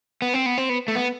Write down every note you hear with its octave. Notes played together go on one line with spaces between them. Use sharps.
B3
C4
B3
C4
B3
A3
B3